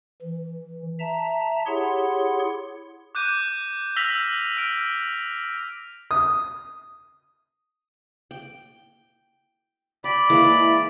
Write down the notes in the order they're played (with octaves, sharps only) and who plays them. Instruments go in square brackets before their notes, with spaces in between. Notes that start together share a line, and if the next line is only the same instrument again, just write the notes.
[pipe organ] E3
E5 A5 A#5
E4 G4 G#4 C#5 F#5 C6
[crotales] D6 F#6 G6 D#7
E6 F6 A#6 B6 F7 G7
F6 D7
[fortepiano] D#6
[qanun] G5
[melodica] D5 B5 [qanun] G5
[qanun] E3 G#3 A#3 [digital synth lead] E4